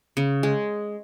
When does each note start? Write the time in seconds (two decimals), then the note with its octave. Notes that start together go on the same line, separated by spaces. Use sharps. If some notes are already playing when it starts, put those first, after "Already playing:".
0.17 C#3
0.43 G#3